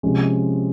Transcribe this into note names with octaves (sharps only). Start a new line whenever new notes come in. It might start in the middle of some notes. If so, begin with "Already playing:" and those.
C3 F3 G#3 C#4